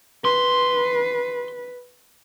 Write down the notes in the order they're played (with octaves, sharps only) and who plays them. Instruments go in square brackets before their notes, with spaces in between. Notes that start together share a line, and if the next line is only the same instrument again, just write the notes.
[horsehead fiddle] B4 [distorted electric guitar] C6